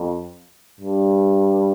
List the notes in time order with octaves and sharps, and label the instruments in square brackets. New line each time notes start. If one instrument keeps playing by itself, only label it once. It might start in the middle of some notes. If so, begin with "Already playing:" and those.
Already playing: [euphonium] F2
G2